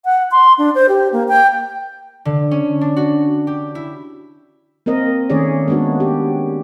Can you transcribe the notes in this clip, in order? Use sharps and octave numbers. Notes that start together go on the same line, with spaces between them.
F#5
C6
D4
C5
G4
A#3
G5
D3
C#4
D4
F#4
G4
E4
A#3 C4 A#4 D#5
D#3 A3 C#4 G#4 C#5 D5
G#3 A#3 B3 D4 F#4
G4